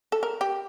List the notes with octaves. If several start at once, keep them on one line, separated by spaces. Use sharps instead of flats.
A4
A#4
G4